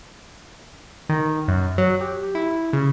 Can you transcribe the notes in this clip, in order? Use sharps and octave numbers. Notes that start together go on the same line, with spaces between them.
D#3
F#2
F#3
G4
E4
C#3